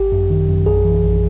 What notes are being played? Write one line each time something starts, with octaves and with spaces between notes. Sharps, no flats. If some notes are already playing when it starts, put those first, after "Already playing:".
Already playing: G#1 G4
F#2
D#3
F#2
A#1 G#4
E3
A#1